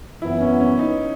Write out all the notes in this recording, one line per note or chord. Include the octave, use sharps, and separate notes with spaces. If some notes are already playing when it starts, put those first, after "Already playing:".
F#2 E3 B3 E4
C#4
C#4
D#4